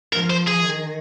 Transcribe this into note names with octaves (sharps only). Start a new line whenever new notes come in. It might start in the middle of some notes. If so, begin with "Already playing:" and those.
F3 A#4
C5
G#4
D#3